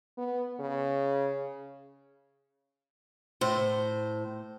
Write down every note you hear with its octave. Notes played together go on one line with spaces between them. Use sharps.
B3
C#3
A2 C5